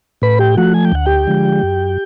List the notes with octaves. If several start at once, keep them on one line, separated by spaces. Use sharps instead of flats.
A2 B4 B5
G4 G5
F3 A3 F#4 F#5
G#5
G5
D2 F#5
G4 G5
D3 F3 G#3
F#2